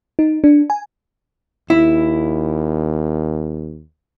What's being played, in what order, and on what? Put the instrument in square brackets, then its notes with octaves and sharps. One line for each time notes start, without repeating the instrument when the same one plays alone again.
[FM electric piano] D#4
D4
G#5
[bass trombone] D#2 [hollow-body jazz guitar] E4